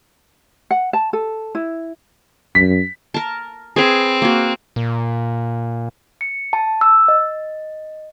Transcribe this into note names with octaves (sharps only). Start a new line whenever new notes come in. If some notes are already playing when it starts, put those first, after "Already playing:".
F#5
A5
A4
E4
F#2 B6
A#4 A5
C4 G#4 B4 G#5
A#3 F#4
A#2
C#7
A5
E6
D#5